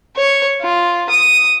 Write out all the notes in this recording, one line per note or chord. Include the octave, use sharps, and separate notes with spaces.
C#5
F4
D#6